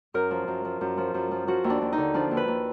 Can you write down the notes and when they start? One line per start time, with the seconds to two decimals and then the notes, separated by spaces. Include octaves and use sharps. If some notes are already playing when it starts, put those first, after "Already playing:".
0.14 F#2 A#4
0.31 F3
0.48 F#2
0.65 F3
0.81 F#2
0.97 F3
1.14 F#2
1.31 F3
1.47 F3 F#4
1.64 D#2
1.70 D4
1.81 D#2
1.92 D#4
1.98 D3
2.14 F3 D4
2.31 D#2
2.37 B4
2.48 D#2